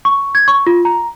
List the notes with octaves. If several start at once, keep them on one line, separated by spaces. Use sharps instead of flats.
C#6
G#6
C#6
F4
A#5